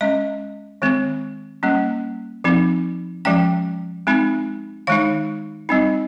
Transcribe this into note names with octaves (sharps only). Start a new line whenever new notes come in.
G#3 C#4 D#5
D#3 G#3 C4
G3 A#3 C#4
F3 C4 D#4
F3 G#3 C#4 G5
G#3 C4 D#4
D#3 G#3 D#4 F5
G3 C4 D#4